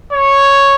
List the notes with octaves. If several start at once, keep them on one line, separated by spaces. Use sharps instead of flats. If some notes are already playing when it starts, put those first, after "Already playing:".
C#5